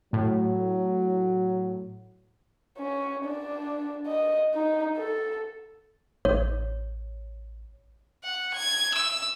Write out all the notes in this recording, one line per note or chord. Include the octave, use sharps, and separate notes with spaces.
A2 F#3
C#4
D4
D#5
D#4
A4
A1 C#5
F#5
G#6
E6